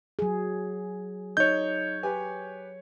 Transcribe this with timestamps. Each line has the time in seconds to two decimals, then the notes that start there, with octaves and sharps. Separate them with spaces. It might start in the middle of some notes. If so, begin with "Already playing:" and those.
0.19 F#3 G#4
1.37 D#4 C#5 G6
2.03 G4 B4 G#5